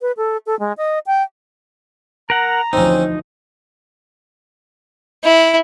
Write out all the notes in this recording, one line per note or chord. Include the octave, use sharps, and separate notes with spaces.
B4
A4
A4
G#3
D#5
G5
A#4 F#5 A#5
D2 E3 F3 C4 C#4 D#4
E4